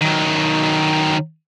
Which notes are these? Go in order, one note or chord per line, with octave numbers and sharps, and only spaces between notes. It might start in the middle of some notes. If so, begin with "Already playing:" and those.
D#3 F#3